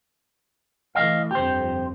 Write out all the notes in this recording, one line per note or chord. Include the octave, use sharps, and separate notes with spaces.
E3 A3 D#5 F5
G1 F2 C4 G4 C5